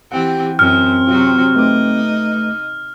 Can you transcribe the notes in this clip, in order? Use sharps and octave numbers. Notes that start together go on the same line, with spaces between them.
E3 C4 G4 F#5 G5
F#2 C4 F6
C3 F#3 F4 F#4
A3 D#4 B4 D6